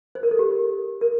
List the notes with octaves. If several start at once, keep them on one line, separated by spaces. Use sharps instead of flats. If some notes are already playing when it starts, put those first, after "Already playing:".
C5
A#4
A4
G4
A#4